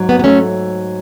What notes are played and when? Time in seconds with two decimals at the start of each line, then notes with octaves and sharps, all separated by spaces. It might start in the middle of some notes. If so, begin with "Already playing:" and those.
Already playing: G#2 F#3
0.09 B3
0.19 B3
0.24 A3 C#4